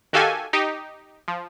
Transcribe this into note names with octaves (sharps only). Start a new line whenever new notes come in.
D#3 F#4 G4 A4 F5 G#5
D#4 G4
F3